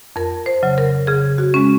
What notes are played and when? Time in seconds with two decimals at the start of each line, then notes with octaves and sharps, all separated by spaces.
0.16 F2 A#4
0.46 C5
0.63 C#3 F#3
0.78 A#4
1.07 C#3 G#4
1.38 F#4
1.54 G#3 C#4